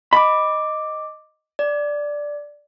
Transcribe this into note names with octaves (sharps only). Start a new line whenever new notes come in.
D#5 B5 D6
D5